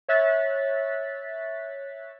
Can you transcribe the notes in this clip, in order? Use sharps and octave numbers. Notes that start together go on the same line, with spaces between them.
C#5 E5 F#6 A6 B6